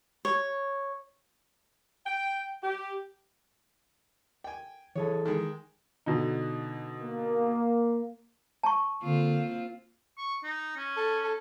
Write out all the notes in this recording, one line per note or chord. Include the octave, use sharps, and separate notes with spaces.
C#5
G5
G4
G5 G#5
E3 G#4 A4 C#5
D#3 G#3
B2 D3 D#4
A#3
A5 C#6
D3 A#3 C4 F4
C#6
D#4
C#4
A4
A4